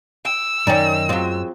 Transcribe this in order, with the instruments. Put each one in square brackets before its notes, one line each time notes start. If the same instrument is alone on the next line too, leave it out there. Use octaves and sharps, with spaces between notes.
[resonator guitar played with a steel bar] G5 [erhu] E6
[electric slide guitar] F#2 G5 [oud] D#3 C#4 [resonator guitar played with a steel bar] D5 G#5 A#5
[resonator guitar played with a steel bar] F#3 G#3 [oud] C4 F4